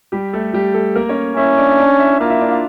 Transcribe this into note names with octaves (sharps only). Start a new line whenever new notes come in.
G3 G4
A3 A4
G3 G4
A3 A4
A#3 A#4
C#4 C#5
C#4 E4 E5
D4 D5
E5
D4 D5
E4 E5
A#3 F4 F5
E4 E5
D4 D5
F4 F5